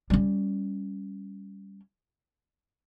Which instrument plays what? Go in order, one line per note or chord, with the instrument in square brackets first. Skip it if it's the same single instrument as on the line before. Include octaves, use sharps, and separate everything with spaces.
[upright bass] G3 C#4